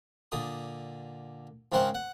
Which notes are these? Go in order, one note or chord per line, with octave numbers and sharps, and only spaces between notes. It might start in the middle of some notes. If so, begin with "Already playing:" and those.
A#2 D3 D#6
G#2 C#3 C4 A#4 C5 F#5
F#5